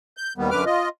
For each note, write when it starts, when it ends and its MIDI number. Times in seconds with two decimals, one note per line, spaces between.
0.17 0.33 91
0.38 0.50 39
0.38 0.50 51
0.38 0.50 55
0.38 0.50 59
0.51 0.64 42
0.51 0.64 50
0.51 0.64 71
0.51 0.64 86
0.51 0.64 89
0.66 0.89 65
0.66 0.89 75